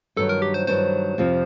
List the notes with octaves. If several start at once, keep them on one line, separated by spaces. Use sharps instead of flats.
G2 D#3 F#3 A4
A#4
G4
C5
G2 D#3 F#3 C5
F2 C3 F3